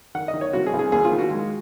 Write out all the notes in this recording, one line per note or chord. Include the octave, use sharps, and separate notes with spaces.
D#3 F#5
D#5
D#3
C#5
C2 F#4
G#4
C2
G#4
D#2 G#4
F4
D#3
F#4
G#3